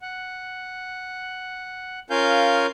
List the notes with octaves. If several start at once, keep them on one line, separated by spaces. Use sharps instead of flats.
F#5
C#4 F4 A#4 F5 G#5 G6